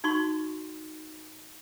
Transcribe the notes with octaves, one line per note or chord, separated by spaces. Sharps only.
D#4 F#4 C6 C#6